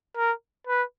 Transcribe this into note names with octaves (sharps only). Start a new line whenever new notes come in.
A#4
B4